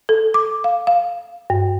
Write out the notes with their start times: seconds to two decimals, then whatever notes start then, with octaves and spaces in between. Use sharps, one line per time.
0.09 A4
0.34 D6
0.64 F5
0.87 F5
1.50 G2